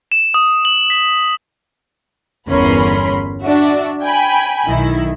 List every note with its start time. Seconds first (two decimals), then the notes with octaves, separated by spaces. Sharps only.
0.12 E7
0.34 D#6
0.65 F#7
0.90 B6
2.48 G1 E2 C#4 A#4 B5 C6
3.42 D4 F#4 E5
4.03 G5 G#5 B5
4.66 B1 D#3 E4